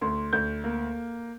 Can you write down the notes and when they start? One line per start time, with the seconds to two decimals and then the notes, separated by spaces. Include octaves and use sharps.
0.01 D2 C6
0.33 D2 G6
0.64 A#3